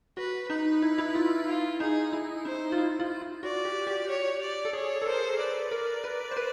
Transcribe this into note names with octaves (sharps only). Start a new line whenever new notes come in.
F#4 B4
D#4 B4
E4
E4
F4
F4
D#4 G#4
E4
D#4 C5
F4
E4
F4
F4
F#4 D5
G4
G4
C#5
D5
A4
G#4 C#5
A4
A#4 C5
B4 D5
A#4 D5
B4
C5
B4